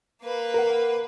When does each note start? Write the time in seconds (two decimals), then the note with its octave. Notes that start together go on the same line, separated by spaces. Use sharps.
0.23 A#3 B4
0.54 A#4 F#5